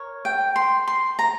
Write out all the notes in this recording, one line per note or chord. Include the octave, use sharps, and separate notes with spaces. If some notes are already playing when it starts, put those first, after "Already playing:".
Already playing: A#4 C#5
G5
C6
C6
A#5